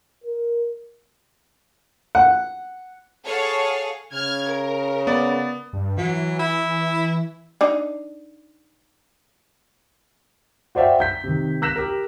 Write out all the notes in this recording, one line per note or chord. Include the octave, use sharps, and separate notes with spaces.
A#4
F#5
G#4 A4 C#5 F5 F#5 A5
C#3 F6 G#6
A#4
B3 D5
G2
E3 F#3
E4
D4 D#4
F#4 C5 D5 E5 F5 G5
G6 B6
C3 D#3
E6 F#6 A#6 B6 E7
G4 A#4